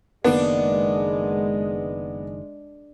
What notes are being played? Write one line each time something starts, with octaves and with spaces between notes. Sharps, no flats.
F#1 D#3 G#3 A#3 B3 D4